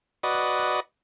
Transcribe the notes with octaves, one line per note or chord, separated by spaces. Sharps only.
F#4 B4 D5 D#5